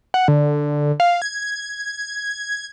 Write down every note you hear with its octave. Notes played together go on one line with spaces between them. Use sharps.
F#5
D3
F5
G#6